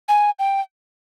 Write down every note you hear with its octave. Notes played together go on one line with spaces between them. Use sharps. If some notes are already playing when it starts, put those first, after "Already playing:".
G#5
G5